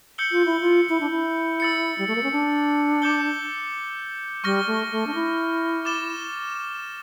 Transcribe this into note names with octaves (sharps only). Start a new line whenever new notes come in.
E6 G6 C#7 G7
F4
E4
F4
E4
D4
E4
E6 A6 C#7
G3
A3
A#3
C#4
D4
D6 G6 C#7 G7
G3 C#6 F6 A#6
A3
A3
D4
E4
D6 A6 E7 G7